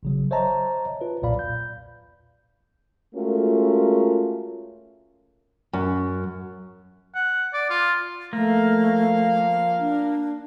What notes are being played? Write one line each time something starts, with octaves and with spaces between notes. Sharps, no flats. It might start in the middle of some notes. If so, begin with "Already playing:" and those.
G#1 C#3 F#3
C5 C#5 D#5 E5 A5 A#5
F4 B4
B1 E2 A#2 D5 F5 B5
G6
G#3 A3 C#4 F4 F#4 A#4
F#2
F#5
D5
F4
F3 A3 A#3 F5
D4